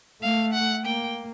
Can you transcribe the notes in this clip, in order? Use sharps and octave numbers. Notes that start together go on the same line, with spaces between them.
A3 F5
F#5
A#3 G5